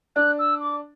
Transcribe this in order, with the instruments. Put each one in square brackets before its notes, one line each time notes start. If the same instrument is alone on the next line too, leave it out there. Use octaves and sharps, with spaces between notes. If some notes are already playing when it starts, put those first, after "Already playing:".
[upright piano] D4 [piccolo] F#6
[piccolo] E6
D6